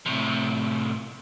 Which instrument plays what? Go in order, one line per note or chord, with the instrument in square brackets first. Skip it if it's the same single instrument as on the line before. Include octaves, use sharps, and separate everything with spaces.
[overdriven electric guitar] A2 C3